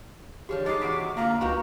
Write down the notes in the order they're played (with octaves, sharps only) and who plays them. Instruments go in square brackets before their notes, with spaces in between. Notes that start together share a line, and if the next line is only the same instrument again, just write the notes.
[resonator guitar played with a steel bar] D3 F3 G3 [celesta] G4 G#4 C#5
[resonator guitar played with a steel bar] G#3 D#4 [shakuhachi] D6 [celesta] A6 C7
[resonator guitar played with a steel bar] E2 C3 F#4 [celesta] B6 D7
[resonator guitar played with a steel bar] D3 F4 [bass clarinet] A#3 [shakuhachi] A#5
[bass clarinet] C#2 [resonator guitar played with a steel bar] F#4 G4 A#4